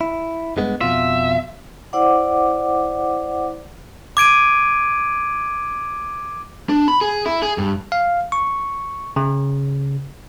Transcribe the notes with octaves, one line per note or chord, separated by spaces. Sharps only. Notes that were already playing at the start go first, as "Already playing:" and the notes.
E4
G2 G#3 B3
F2 B2 F4 E5
E4 C5 D5 F#5 D6
D6 G#6 D7 D#7
D4
B5
G#4
E4
G#4
G2
F5
C#6
C#3